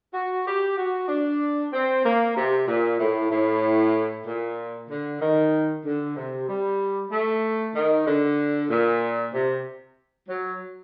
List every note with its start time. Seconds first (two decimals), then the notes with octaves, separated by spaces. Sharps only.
0.14 F#4
0.46 G4
0.78 F#4
1.08 D4
1.73 C4
2.05 A#3
2.36 C3
2.68 A#2
2.99 A2
3.31 A2
4.26 A#2
4.90 D3
5.21 D#3
5.85 D3
6.16 C3
6.48 G3
7.11 A3
7.75 D#3
8.07 D3
8.70 A#2
9.34 C3
10.29 F#3